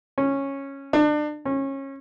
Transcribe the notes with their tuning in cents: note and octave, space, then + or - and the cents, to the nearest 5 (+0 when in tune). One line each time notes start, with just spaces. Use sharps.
C#4 -10
D4 +30
C#4 -25